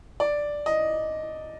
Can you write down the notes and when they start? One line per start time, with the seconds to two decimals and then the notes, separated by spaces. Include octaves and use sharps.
0.20 D5
0.66 D#5